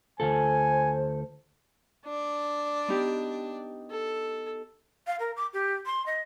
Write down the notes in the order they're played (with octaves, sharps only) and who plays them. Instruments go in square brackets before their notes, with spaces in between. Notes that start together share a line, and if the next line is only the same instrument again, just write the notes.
[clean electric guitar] D2 F4 A4 [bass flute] C5 [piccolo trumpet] G#5
[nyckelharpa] D4 D5
[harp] B3 D#4 G4
[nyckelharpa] A4
[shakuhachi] F5
A#4
D6
G4
C6
D#5